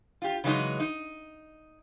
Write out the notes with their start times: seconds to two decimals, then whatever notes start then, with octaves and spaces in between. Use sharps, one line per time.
0.22 F4 G4
0.44 C#3 E3 F#3 G#3 D#4
0.80 D#4